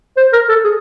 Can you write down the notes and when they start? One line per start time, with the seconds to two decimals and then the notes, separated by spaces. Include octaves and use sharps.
0.17 C5
0.33 A#4
0.49 A4
0.65 G#4